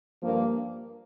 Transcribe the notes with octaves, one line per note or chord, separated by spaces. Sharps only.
G2 F3 A#3